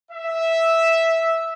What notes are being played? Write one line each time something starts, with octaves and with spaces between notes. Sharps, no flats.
E5